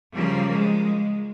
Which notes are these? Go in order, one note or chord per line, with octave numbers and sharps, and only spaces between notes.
C#3 F3 G3 A#3
G#3